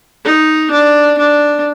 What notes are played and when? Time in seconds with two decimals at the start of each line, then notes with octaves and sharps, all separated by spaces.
0.24 D#4
0.71 D4
1.18 D4